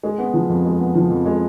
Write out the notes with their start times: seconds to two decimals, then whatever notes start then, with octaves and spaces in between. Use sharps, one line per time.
0.03 G#3
0.18 B3
0.34 F3
0.49 F2
0.65 G#3
0.80 B3
0.95 F3
1.10 F2
1.25 G#3